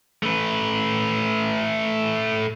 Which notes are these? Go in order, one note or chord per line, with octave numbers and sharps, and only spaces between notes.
A3 B4